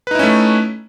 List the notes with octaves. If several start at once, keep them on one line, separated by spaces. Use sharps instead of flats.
A3 C#4 D#4 E4 B4